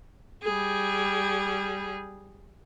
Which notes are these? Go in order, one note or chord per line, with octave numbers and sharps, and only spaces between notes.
G3 G#4